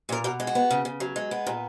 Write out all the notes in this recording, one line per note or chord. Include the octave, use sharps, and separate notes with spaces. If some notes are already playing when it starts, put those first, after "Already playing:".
A#2 A#4
B2 A#4
G#3
F#4
B3
C#3
C#3
F#3
G#3
B3
A#2